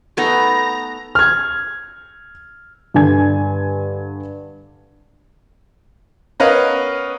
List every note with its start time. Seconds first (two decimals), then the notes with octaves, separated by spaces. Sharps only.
0.17 A3 B3 D#4 A#5
1.15 F6 G#6
2.94 G2 D3 D4 G#5 G#6
6.40 B3 C#4 A#4 B4 D#5 F5